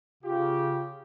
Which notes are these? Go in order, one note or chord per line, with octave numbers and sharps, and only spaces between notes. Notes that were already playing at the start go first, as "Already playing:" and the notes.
C#3 F4 G4